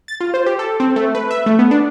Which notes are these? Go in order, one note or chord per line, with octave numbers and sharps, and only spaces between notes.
A6
F4
C5
G4
A4
C4
A3
B4
E5
A3
B3
D4